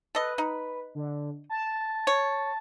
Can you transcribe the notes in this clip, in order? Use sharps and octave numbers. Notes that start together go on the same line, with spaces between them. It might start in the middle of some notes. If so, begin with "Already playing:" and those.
A4 B4 D#5
D#4
D3
A5
C#5